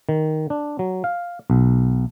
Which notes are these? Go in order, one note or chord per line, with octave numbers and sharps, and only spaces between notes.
D#3
D4
F#3
F5
B1